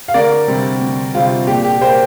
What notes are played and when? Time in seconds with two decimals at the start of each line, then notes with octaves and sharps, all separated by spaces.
0.08 F5
0.14 D2 A#4 D5
0.48 C3 G3 C4
0.81 D2
1.14 C3 G3 C4 F4
1.47 A#2 G4
1.64 G4
1.81 A#3 G4 C5